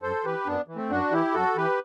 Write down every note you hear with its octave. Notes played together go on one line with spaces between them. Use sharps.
F#2 A4 C5
E3 G4 B4
F#2 B3 D4
E3
A3 C4
F#2 D4 F#4
E3 E4 G4
F#2 F#4 A4
E3 G4 B4